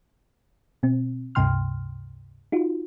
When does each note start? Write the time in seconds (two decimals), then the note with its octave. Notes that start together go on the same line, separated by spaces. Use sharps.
0.83 B2 C4
1.35 C#2 G2 C3 G5 C6 F6
2.52 D#4 F4 F#4